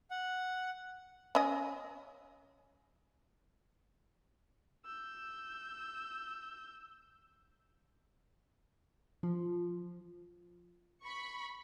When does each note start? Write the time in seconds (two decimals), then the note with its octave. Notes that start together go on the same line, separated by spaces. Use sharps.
0.11 F#5
1.35 C#4 D#5
4.85 E6 G6
9.23 F3
11.02 B5 C#6